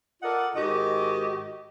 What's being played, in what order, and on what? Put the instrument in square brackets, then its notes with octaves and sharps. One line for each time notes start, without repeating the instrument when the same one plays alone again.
[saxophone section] F4 A4 A#4 D5 D#5 F#5
G#2 D#3 F#4 G4 D#5